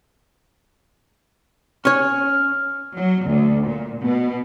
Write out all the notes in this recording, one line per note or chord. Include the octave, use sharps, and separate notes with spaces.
C#4 C#5 F6
F#3
D2
A#2
B2